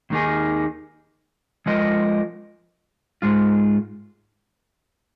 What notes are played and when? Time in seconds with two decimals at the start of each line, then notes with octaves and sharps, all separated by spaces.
0.10 D#2 D#3 A#3 D#4 G#4
1.66 F3 G#3 F4 A#4 D#5
3.22 G#2 G#3 F4